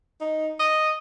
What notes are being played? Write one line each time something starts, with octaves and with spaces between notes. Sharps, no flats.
D#4
D#5